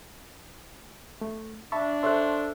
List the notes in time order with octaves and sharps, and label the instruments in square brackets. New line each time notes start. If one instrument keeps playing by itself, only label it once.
[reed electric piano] A3
[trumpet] D4 [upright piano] E5 [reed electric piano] A5 B5 C#6
[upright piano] A4 C5 E5 [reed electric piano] C6 C#6 F#6